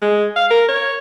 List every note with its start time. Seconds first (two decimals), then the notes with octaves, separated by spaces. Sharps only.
0.02 G#3
0.36 F5
0.51 A#4
0.68 C#5